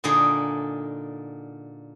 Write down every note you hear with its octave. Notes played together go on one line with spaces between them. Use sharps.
A#2 D3 D#4 G#4